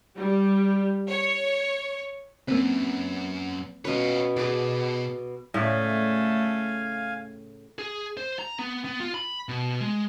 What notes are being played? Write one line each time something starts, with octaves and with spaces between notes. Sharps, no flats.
G3
C#5
C#2 F#2 A#3 C4 B4
B2 C#4 F4 B4 C#5
B2 G#4 B4 D5
A2 C#3 A3 D5 F5 G#5
G#4
C5
A#5
B3
B3
F4
B5
B2
G#3